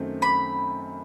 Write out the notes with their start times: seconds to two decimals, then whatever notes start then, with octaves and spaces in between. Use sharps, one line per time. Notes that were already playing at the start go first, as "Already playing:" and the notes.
Already playing: F#2 D#3 F#3 A3 C4
0.22 B5